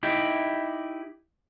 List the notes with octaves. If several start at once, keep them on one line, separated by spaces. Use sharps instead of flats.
D#4 E4 G4